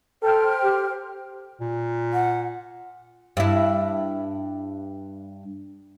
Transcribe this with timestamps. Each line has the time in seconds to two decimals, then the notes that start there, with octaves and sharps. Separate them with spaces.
0.23 A4 C5 G5 F6
0.63 G4
1.60 A#2
2.13 F#5
3.37 G2 E4